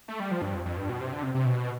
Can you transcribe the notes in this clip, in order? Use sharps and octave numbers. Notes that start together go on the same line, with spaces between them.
A3
G3
F3
G2
F2
F2
G2
B2
C3
D3
C3
C3
B2